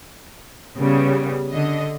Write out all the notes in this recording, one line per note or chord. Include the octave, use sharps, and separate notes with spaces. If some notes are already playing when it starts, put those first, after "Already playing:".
C#3 G3 B3
D3 D#5